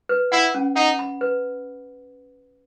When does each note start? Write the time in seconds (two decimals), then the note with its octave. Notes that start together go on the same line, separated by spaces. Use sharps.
0.09 B4
0.32 E4 F#5
0.55 C#4
0.76 D#4 F#5
0.99 B5
1.21 B4